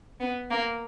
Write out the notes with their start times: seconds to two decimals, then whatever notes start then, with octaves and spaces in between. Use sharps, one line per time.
0.20 B3
0.50 A#3